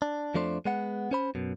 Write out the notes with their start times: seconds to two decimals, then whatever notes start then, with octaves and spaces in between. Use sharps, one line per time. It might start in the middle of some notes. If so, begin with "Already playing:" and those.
0.02 D4
0.34 F2 F3 A3 D4 C5
0.65 G#3 B3 F#5
1.11 C#4 C5 B5
1.35 F#2 B2